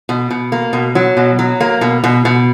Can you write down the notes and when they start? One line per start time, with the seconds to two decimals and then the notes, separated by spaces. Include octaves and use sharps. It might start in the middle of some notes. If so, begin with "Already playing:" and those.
0.09 B2
0.31 B2
0.52 A#3
0.73 B2
0.95 F#3
1.17 B2
1.39 F#3
1.60 A#3
1.81 B2
2.04 B2
2.25 B2